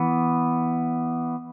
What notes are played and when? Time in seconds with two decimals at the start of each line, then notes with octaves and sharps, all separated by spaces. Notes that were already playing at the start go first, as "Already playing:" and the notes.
Already playing: E3 B3